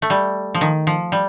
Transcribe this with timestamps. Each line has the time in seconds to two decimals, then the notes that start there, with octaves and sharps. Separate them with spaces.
0.02 A3
0.10 G3
0.55 F3
0.61 D#3
0.87 F3
1.12 G3